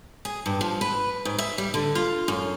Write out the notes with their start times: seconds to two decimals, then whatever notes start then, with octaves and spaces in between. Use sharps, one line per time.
0.25 G#4
0.46 G2
0.61 F3
0.81 B4
1.25 G#2
1.39 E5
1.58 G3
1.74 D3
1.95 F4
2.28 F#2